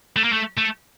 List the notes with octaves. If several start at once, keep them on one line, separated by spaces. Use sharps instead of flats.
A3
A#3
A3
A3